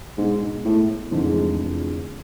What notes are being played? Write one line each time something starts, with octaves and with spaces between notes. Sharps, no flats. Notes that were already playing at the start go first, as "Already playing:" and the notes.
G#2 B2 G#3 D4
A2
F1 E2 G#2 D3 F3